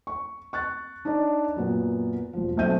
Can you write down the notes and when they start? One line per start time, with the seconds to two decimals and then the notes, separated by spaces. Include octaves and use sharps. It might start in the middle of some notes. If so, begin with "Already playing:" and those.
0.07 C#6
0.53 C#6 F#6 A6
1.05 D4 D#4 C#5 D5
1.57 F#2 A#2 F#3 B3
2.33 E1 F3
2.57 B1 A3 C4 E5 G6 D#7